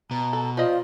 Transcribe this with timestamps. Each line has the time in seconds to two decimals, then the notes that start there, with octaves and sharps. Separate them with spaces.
0.11 B2 A#5
0.33 A4
0.57 F3 F4 D5 D#5